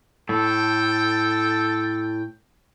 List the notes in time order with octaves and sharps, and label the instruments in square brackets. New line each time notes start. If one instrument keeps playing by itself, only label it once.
[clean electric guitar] A2 [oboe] A4 [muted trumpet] G5